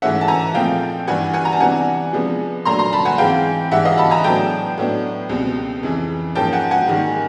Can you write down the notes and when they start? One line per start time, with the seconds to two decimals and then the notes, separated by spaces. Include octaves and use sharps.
0.02 G#2 E3 A3 C#4 E5 F#5
0.21 A5
0.28 G#5 A#5
0.54 A#2 F3 A3 C4 F5 G5
1.07 G2 E3 G3 F#5 G#5
1.34 F#5 G#5
1.45 A#5
1.53 A5
1.60 C3 E3 G3 B3 D4 F#5 G#5
2.13 C3 F3 G#3 B3 D4
2.65 A#2 F#3 A3 D4 A#5 C6
2.79 A#5 C6
2.93 A5 B5
3.05 F#5 G#5
3.18 G#2 E3 G#3 C4 F5 G5
3.71 G#2 E3 G3 E5 F#5
3.85 D#5 F5
3.98 A5 B5
4.11 G#5 A#5
4.24 A2 F#3 B3 D4 G5 A5
4.78 A2 F#3 B3 D4
5.29 C#2 B2 G3 C4
5.83 F2 C#3 E3
6.35 G#2 F3 A#3 C#4 G5 A5
6.53 F#5 G#5
6.71 F#5 G#5
6.88 G#2 D#3 G3 A#3